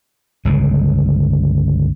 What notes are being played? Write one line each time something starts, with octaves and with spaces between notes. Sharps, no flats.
G1 C#2 C#3